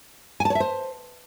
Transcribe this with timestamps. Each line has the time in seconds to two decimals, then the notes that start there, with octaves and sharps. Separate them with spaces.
0.40 G#5
0.45 A5
0.50 C#5
0.55 E5
0.60 C5